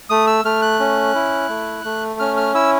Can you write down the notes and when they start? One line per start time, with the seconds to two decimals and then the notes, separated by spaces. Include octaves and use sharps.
0.10 A3 D#6
0.27 E6
0.45 A3 F6
0.62 F#6
0.80 C#4
1.15 E4
1.49 A3
1.85 A3
2.20 C#4 F6
2.37 F6
2.55 E4 E6